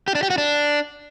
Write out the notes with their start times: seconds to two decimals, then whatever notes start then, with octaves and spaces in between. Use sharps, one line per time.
0.08 G4
0.15 D4
0.23 G4
0.30 F#4
0.38 D4